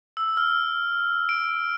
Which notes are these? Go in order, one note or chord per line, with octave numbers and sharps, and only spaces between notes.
E6
F6
D7